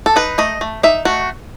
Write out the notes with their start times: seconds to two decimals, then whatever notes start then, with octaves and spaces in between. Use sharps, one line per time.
0.06 A4
0.16 D#4 B4
0.38 A3 D#5
0.61 A3
0.83 D#4 E5
1.05 A3 F#4